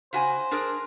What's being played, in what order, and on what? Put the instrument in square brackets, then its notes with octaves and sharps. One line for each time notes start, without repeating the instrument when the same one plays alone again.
[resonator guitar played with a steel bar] C#3 F#4 G#5 [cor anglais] C5
[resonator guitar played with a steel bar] D4 G#4 A#4